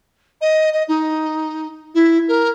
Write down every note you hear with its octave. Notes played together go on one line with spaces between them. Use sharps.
D#5
D#5
D#4
E4
A#4